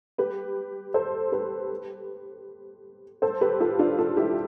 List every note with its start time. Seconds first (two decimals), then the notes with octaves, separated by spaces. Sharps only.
0.18 G4 B4
0.94 A4 C5
1.32 G4 B4
3.22 A4 C5
3.41 G4 B4
3.60 F4 A4
3.79 D4 F4
3.99 F4 A4
4.17 E4 G4